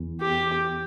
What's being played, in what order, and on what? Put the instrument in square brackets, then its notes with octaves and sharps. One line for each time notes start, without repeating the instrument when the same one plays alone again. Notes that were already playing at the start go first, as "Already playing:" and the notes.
Already playing: [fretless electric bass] E2
[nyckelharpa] G4